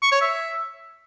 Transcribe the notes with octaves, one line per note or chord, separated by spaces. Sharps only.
C#6
C#5
E5